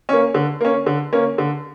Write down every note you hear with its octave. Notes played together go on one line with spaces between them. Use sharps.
A#3 C#4
D3
A#3 C#4
D3
A#3 C#4
D3